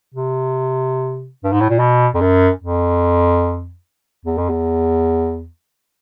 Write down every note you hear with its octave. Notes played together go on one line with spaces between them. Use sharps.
C3
G2
G#2
A2
A#2
B2
F2
F#2
F2
E2
F2
E2